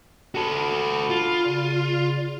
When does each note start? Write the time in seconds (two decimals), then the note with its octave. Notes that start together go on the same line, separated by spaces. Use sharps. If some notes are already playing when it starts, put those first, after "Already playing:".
0.35 F#4 A4 B5
1.10 F4
1.44 C#3 D5